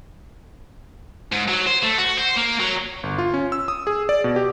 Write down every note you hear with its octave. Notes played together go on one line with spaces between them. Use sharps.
G#2
F#3
C5
A3
F#4
C5
A#3
F#3
G1
F4
C#4
E6
D#6
G#4
D5
B2
G4